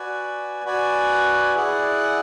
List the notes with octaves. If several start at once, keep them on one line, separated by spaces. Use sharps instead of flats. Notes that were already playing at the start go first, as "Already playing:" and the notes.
Already playing: F#4 B4 D5 G#5
F#4 B4 D5 G#5
E4 G#4 D5 F#5